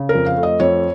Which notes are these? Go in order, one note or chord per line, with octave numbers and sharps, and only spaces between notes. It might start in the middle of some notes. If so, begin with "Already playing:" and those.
Already playing: C#3
A#4
F2
F5
A3
D#5
F2 C#5